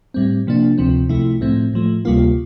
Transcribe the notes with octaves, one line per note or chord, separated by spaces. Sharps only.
A2 G3 C4
C3 F3 A#3 D4
D2 C3 F3 C4
C2 C3 F3 A3 E4
A2 F3 A3 C4
A2 F3 A3
D2 C3 G3 A#3 F4